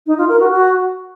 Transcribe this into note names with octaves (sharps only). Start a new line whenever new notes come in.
D#4
F4
A#4
F#4
F#4